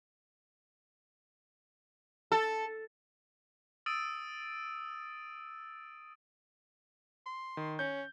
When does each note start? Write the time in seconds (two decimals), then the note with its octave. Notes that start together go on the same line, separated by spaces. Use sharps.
2.32 A4
3.86 D#6 E6 A6 D7 D#7
7.26 C6
7.57 D#3
7.79 C#4 G6